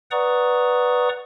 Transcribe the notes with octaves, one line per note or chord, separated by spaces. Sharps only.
B4 D5 F#5 A#5 C#6 D#6